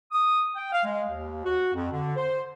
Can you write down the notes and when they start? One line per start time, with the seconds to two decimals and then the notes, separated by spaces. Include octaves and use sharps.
0.12 D#6
0.56 G5
0.73 F5
0.85 G#3
1.09 D#2
1.44 F#4
1.74 F2
1.91 D3
2.17 C5